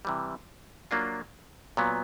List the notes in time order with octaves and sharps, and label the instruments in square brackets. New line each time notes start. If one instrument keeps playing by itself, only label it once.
[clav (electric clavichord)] C3 E3 G3
F#3 A#3 D4 F4
A#2 F#3 B3